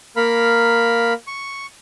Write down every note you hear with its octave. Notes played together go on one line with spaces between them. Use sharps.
A#3 A#4 F5 B5
C#6